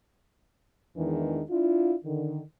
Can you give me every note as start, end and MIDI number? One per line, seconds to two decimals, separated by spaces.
0.97 1.42 40
0.97 1.42 51
0.97 1.42 52
0.97 1.42 56
0.97 1.42 62
1.50 1.95 62
1.50 1.95 64
1.50 1.95 65
2.05 2.41 50
2.05 2.41 51